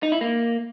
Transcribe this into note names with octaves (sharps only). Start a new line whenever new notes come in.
D#4
E4
A#3